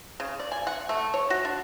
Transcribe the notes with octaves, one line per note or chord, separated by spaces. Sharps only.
C#3
D5
G#5
F#5
A3
C#5
F#4
D4